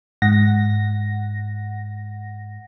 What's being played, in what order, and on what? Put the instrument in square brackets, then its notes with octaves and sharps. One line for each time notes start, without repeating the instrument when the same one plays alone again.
[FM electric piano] G#2 F#5 A#6